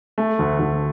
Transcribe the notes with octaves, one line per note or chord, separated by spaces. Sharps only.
A3
D2
D2